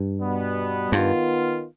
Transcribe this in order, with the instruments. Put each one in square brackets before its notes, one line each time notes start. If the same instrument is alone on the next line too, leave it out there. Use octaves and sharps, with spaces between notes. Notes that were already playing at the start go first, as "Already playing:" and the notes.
Already playing: [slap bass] G2
[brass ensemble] B2 G3 B3
[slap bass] G2 [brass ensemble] D#3 B3 F4